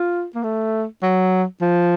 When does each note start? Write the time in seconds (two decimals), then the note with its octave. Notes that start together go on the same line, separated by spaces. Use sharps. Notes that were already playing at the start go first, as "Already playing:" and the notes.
Already playing: F4
0.35 A#3
0.43 A3
1.02 F#3
1.61 F3